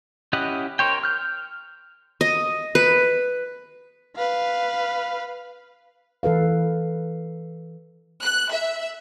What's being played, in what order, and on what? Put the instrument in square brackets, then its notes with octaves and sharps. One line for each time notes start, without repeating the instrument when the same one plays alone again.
[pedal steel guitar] C#4 E4 G4 D#5 F#5
A#4 C5 C#5 G5
F6 G6
[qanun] D#5
B4
[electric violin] B4 F5
[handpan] E3 A4 B4 F5
[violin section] F#6
E5